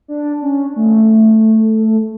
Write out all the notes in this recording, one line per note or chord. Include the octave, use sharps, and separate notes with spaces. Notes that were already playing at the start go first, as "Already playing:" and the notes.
D4
C#4
A3